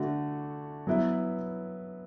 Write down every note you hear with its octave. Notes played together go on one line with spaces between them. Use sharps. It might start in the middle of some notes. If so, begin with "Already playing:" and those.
Already playing: D3 A3 D4 F#4
F#3 B3 E4 B4